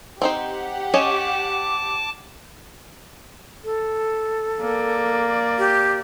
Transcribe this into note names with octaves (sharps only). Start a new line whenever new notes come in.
C4 D#4 G4 C5 F#5
C#4 C#5 D#5 A5 D6
A4
A#3 D5
G4